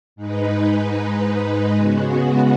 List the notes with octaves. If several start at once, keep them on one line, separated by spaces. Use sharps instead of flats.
G#2 G#3 D#4 B4
C#3 G#3 B3 F#4